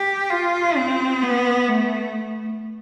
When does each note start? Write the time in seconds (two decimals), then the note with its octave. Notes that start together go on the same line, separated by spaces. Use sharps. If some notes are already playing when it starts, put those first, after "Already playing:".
Already playing: G4
0.30 F4
0.76 C4
1.22 B3
1.68 A3